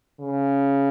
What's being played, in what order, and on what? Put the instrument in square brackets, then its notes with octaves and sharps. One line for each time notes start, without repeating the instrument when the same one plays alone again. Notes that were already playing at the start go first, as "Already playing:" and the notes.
[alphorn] C#3